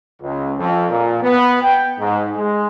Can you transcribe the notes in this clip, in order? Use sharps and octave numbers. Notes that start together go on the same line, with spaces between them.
C#2
F2
A#2
B3
G5
G#2
G#3